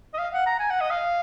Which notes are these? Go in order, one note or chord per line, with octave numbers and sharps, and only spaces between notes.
D#5
F5
F#5
A#5
G#5
F#5
D#5
F5